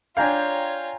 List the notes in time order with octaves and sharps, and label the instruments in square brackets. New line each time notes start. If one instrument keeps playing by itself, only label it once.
[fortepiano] D4 F5 [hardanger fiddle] F4 C#5 [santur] G5 G#5 A#5